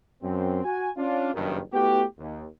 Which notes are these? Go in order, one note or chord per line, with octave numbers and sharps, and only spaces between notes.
F#2 C4
F#4 G#5
C#4 D4 F4
F#1 G2 D#3
A3 B3 E4 F#4 G4
D#2